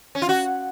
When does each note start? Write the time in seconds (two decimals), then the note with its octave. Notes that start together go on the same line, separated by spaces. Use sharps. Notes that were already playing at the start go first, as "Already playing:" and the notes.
0.15 C#4
0.22 F4
0.29 F#4